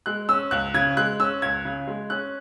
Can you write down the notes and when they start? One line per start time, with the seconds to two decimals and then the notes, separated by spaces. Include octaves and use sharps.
0.06 G#3 F#6
0.29 C#4 E6
0.51 C#2 F#6
0.74 C#3 G#6
0.97 G#3 F#6
1.20 C#4 E6
1.42 C#2 G#6
1.65 C#3
1.88 G#3
2.10 C#4 F#6